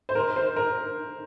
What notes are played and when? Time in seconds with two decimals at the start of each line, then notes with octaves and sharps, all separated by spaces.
0.09 C5
0.15 A#4
0.36 C5
0.56 A#4